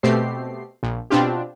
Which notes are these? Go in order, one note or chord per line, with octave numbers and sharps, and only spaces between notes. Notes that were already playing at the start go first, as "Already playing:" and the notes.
B2 A3 C4 G4 C7
A#1
B2 C4 D4 F4 G4